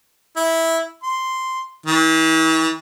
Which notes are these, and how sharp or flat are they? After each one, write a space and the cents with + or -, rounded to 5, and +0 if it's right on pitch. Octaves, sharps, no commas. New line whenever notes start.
E4 -10
C6 -5
E3 -40